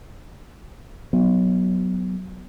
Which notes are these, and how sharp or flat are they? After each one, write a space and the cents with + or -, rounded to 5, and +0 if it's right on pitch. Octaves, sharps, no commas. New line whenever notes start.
F#3 +0 B3 +0